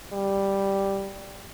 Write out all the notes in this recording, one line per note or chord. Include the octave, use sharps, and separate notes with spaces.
G3